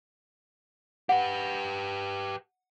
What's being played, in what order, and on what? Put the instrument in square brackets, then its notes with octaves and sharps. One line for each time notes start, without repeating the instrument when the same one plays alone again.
[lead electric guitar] G4 B4 [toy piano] F#5